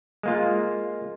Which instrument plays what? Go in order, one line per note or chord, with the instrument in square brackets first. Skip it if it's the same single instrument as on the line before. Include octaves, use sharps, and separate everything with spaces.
[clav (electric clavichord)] G#3 A#3 F4